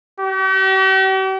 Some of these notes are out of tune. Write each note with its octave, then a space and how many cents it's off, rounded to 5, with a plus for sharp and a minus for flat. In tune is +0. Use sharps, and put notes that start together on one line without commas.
G4 -45